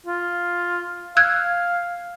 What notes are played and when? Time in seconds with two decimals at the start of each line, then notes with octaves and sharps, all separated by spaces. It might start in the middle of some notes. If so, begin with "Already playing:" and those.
0.07 F4
1.17 F5 E6 F#6 G#6